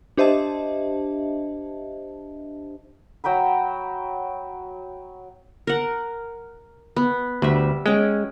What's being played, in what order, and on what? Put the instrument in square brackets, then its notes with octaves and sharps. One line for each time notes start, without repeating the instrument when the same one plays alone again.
[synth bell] D4 G4 C5 D#5 E5 A5
[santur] F#3 G5 A#5 B5
[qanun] A#4 F#5
B3
[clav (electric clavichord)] D2 [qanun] G3 E5
[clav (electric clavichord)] G#3 [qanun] C#4 G5